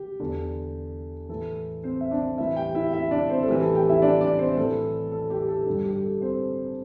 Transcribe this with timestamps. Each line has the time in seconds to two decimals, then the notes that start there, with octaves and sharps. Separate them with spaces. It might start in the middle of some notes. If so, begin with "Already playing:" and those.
Already playing: G4
0.20 E2 D3
1.29 A2 E3 A4
1.84 C4 C5
2.01 E5
2.11 D4 D5
2.38 A2 E3 E4 E5
2.57 G4 G5
2.75 E4 E5
2.93 E4 E5
3.11 D4 D5
3.30 C4 C5
3.43 A4
3.48 A2 E3 G4
3.61 A4
3.75 G4 G5
3.89 E4 E5
4.02 D4 D5
4.21 D4 D5
4.39 C4 C5
4.57 A2 E3 A4
5.12 A4
5.30 G4
5.48 A4
5.66 G2 D3
5.84 G4
6.04 A4
6.21 C4 C5